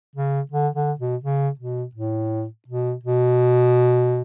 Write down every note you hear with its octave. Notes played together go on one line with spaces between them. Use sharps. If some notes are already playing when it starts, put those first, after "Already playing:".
C#3
D3
D3
B2
C#3
B2
A2
B2
B2